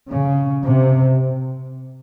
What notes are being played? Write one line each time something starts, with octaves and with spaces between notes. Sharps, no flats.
C#3
C3